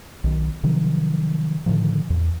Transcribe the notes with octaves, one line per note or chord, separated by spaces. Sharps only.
B1 D#3
C3 D#3 F3 F#3
A2 D3 D#3 F3
E2